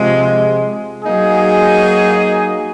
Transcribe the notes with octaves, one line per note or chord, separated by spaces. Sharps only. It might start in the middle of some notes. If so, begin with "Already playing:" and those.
Already playing: C3 F3 G#3
F#3 A#3 D#4 G#4